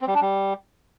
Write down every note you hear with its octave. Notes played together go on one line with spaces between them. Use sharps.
C4
G3
D4
G3